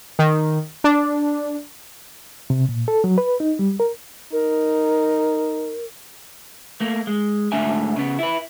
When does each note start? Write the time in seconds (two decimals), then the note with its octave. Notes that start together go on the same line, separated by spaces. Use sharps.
0.19 D#3
0.84 D4
2.50 C3
2.69 A#2
2.88 A4
3.04 F#3
3.18 B4
3.40 D#4
3.59 G3
3.80 A#4
4.33 D#4 A#4
6.80 A3 A#3
7.07 G#3
7.52 G#2 D3 A3 D4 E5 G#5
7.96 C#3 B3
8.19 E4 B4